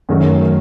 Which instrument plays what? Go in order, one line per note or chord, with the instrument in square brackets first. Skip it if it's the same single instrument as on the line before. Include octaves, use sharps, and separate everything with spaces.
[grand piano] F#2 D#3 F#3 A3